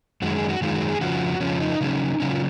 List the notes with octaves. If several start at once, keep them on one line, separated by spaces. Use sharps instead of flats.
F#2 D#3 G#3 F#4
G#4
F#4
F#2 D#3 G#3 F4
F#4
G#4
F2 C#3 F3 F#4
F2 C#3 F3 C#4
D#4
C#3 F#3 C#4 D#4
C#3 F#3 C#4 D#4
F4